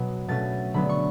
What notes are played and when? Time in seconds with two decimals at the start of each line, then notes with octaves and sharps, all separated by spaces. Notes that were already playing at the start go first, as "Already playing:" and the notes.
Already playing: B2 F#3 B3
0.28 B2 A3 C#4 A6
0.74 D3 F#3 B3 B5
0.89 C#6